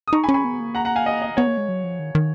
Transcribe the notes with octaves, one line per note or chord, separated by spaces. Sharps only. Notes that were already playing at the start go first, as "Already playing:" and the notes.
D#6
D#4 A#5 C#6
G#5 B5
C#4 C#6
G#5 B5
B3
A#3
F#5 A#5
F#5 A#5
F5 G#5
D#5
D#5
B3 C#5
A#3
G#3
F#3
F3
D#3
D#3